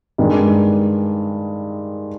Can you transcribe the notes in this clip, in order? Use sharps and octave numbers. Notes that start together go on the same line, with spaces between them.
G2 D#3 G#3